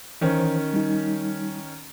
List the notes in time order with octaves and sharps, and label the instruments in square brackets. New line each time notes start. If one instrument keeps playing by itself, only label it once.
[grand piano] D#3 C#4 [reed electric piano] E3 C5
[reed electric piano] G3 D#4